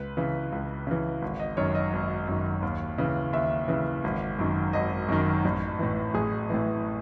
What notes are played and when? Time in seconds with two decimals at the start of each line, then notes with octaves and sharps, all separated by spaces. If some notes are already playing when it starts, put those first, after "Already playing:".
Already playing: C#2 B4
0.17 C#3 E3
0.52 C#2
0.87 C#3 E3
1.22 G#1
1.40 D#5
1.57 F#2 D#3 C#5
1.75 D#5
1.93 G#1
2.28 F#2 D#3
2.62 D#2
2.98 C#3 E3
3.33 D#2 E5
3.68 C#3 E3
4.04 G#1
4.39 F#2 D#3
4.73 G#1 D#5
5.08 F#2 D#3
5.45 A1
5.79 A2 E3
6.14 A1 G#4
6.50 A2 E3